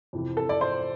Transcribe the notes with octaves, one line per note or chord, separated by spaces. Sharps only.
F2 C3 E3
A4
D5
C5